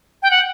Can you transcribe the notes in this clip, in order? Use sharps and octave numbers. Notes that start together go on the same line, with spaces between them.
G5
F#5